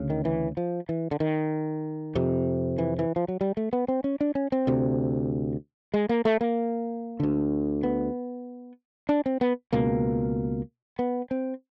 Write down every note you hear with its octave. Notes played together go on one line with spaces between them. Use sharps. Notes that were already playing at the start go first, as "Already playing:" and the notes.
Already playing: D2 C#3
D#3
E3
F3
E3
D3
D#3
F2 C3
E3
E3
F3
F#3
G3
A3
B3
C4
C#4
D4
C#4
C4
D2 C3
G#3
A#3
A3
A#3
D2 D3
B3
D4
C4
B3
C#2 B2 A#3
B3
C4